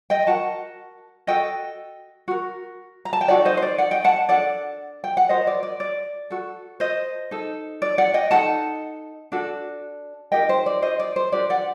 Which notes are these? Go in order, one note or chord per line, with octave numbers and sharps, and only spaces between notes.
D#5 G5
F#4 A#4 F#5 A5
F#4 A4 D#5 G5
F#4 A#4
A#5
A5
G5
D#4 F#4 A4 D5 F#5
C5 D#5
C5
D5
D5 F#5
D#5 G5
F#5 A5
D4 F#4 A4 D5 F#5
G5
F#5
F#4 A#4 C5 D#5
D5
D5
D5
F#4 A4
C5 D#5
D#4 A4
D5
D5 F#5
D#5 G5
D#4 F#4 A4 F#5 A5
D4 F#4 A4
D#4 G4 A#4 D#5 G5
C5
D5
C5 D#5
D5
C5
D4 G4 A#4 D5
D5 F#5